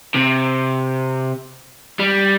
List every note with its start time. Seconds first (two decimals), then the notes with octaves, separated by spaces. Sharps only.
0.14 C3
1.99 G3